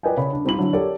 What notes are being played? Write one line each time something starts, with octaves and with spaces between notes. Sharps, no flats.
A#4 B4 D5 D#5 G5 G#5
C#3 C#5 B5
D4
G3 C4 D#4 F4 B5 F#7
D3 F#3 E4
G4 A4 A#4 C#5 D5